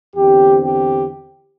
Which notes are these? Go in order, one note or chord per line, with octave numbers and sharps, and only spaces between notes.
E2 D3 C4 G4
G4